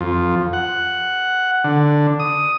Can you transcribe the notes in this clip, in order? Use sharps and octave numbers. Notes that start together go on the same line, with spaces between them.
F2
F#5
D3
D#6